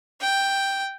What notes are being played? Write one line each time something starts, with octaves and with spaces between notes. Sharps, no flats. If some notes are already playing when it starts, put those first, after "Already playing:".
G5